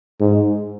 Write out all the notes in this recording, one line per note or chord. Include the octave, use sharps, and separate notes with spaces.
G#2